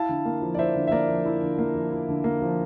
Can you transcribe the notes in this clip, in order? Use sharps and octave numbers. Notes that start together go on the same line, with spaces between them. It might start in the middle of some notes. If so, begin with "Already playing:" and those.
Already playing: E4 F5 A5
D3
A#3
F3
D5
E4 C5 E5
D3
E5
A#3 A#4 D5
F3
E4
D3
A#3
F3
E4
D3
A#3
F3